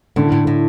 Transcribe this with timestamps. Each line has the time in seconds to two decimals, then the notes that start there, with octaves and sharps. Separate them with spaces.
0.16 A2 D3
0.32 A2
0.47 A2